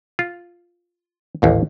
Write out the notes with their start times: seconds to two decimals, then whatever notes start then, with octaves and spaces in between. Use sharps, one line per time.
0.19 F4
1.42 A1 D#2 G#2